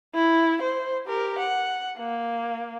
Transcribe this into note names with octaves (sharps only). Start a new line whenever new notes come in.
E4
C5
G4 A#4
F#5
A#3